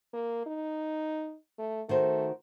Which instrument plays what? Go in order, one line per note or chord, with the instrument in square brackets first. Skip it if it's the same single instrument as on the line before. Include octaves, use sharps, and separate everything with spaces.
[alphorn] A#3
D#4
A3
[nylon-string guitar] D#3 F#4 C5 [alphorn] A3